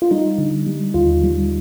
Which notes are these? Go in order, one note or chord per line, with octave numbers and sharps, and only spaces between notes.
F4
G3 D#4
D3
G3
D#2 F4
G3